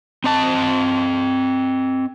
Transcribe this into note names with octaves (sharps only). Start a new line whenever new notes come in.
C4 D#5 A5